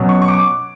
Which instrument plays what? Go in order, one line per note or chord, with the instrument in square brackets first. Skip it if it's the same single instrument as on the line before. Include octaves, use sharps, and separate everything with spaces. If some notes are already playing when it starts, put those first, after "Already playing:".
Already playing: [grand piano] B2 F#3 C#4
C#6
C#6
D6